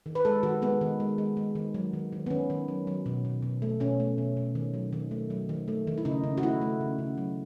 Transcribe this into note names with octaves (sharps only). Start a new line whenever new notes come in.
D#3
B4
G#3 A4
D#3 F#4
G#3 B3
D#3
G#3
G#3
G#3
D#3
F#3
D#3
D#3
B3
D#3 C#4
D#3
F#3
F#3
B2
B2
B2
A3
B2 C#4
A3
B2
B2
D#3
F#3
D#3
A3
F#3
D#3
A3
D#3
E4
C#3 D#4
C#3
F#4
A3 E4
A3
C#3
C#3
F#3